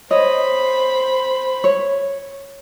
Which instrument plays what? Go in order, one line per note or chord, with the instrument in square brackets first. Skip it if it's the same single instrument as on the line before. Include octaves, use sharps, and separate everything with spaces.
[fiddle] C5 B5 [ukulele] C#5 D#5
[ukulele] C#5